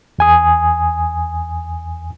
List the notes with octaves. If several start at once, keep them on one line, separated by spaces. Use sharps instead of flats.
E2 G#5 D#6